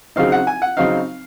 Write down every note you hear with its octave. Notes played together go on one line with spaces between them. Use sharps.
C#3 F#3 C4 D#4 F5
F#5
G#5
F#5
C#3 F#3 C4 D#4 F5